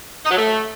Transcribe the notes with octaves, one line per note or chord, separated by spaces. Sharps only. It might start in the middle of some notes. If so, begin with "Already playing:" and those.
D#4
F#3
A3